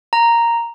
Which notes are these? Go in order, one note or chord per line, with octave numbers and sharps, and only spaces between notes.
A#5